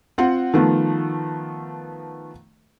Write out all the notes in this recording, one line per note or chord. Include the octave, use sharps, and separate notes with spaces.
C4 F4 F#5
D#3 F3 A3 B3